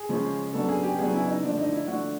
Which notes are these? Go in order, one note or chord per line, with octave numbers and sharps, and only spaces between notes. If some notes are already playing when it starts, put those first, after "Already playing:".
Already playing: G#4
C#3 F3 G#3 C#4
C#3 F#3 B3 D4 A4
G#4
G4
C#3 F#3 B3 D4 G#4
E4
D#4
D3 F3 A3 D4
D#4
E4
D3 F3 A3 D4 F#4